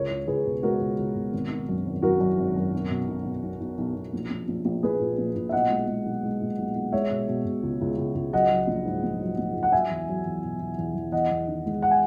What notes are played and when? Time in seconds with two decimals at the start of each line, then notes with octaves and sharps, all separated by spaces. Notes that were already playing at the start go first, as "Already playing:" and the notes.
Already playing: C#2 A#4 C#5
0.11 C#2
0.27 C#2 G#4 B4
0.46 B2
0.63 G#3 F#4 A#4
0.80 C#2
0.99 C#2
1.15 B2
1.33 G#1
1.50 D#3
1.69 F#2
1.85 G#1
2.02 F#2 F#4 A#4
2.20 F#2
2.38 G#1
2.56 F#2
2.73 B1
2.90 B2
3.08 B1
3.25 B2
3.43 B1
3.60 B1
3.78 B1
3.95 B1
4.13 A#1
4.30 A#1
4.48 A#1
4.65 A#1
4.83 A#1 G#4 B4
5.00 A#2
5.18 A#1
5.36 A#2
5.49 E5
5.52 B1 D#5 F#5
5.70 G#3
5.88 G#3
6.06 B1
6.23 G#3
6.41 A#2
6.58 B1
6.75 B1
6.92 G#3 C#5 E5
7.10 B2
7.28 B2
7.45 B2
7.63 C#2
7.81 C#2
7.98 C#2
8.15 C#2
8.33 F#3 D#5 F#5
8.51 F#3
8.67 A#1
8.85 G#2
9.03 A#1
9.20 F#3
9.38 A#1
9.55 G#2
9.63 F#5
9.72 F#3 E5 G#5
9.90 E2
10.08 F#3
10.25 E2
10.43 B2
10.60 E2
10.78 E2
10.95 E2
11.12 E2 D#5 F#5
11.31 E2
11.48 D#3
11.66 G#3
11.82 F#5
11.91 G#5